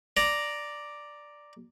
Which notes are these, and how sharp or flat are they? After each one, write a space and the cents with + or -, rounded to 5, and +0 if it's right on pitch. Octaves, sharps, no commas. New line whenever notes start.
D5 +0 A#5 +0